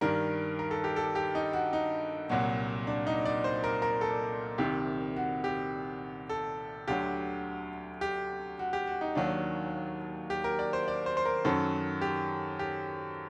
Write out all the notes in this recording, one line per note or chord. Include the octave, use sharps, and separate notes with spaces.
G2 D#3 G3 A#4
A#4
A4
G4
A4
G4
D#4
F#4
D#4
C2 A#2 F#3 F#4
D4
D#4
D5
C5
A#4
A#4
A4
C2 C3 D#3 G4
F#4
G4
A4
D2 D3 F#3 G4
G4
F#4
G4
F#4
D#4
D#2 D#3 F#3 D4
G4
A#4
D5
C5
D5
C5
C5
A#4
F#2 D#3 F#3 A4
G4
G4